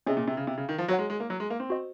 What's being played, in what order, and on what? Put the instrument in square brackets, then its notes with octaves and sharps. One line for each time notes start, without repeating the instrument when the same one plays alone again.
[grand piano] C3 [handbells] C#4 G#4 D#5
[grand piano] A#2
C3
C#3
C3
C#3
D#3
F3
[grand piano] F#3 [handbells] F#4 C#5 F#5
[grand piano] G#3
G#3
A#3
F#3
G#3
A#3
C4
[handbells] F#4 C5 D#5